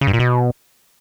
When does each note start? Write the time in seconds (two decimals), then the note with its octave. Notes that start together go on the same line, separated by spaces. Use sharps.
0.01 C#3
0.07 G2
0.13 A#2
0.19 B2